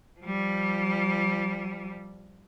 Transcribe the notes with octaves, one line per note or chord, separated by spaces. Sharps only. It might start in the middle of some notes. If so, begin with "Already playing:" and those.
F3 G3